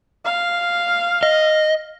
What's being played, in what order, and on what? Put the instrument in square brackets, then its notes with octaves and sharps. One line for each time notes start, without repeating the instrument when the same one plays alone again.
[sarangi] F5
[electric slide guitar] D#5